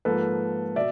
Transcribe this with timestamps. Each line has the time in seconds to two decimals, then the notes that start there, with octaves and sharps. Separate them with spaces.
0.05 G#2 F3 A#3 A4 B4
0.76 B2 D5 E5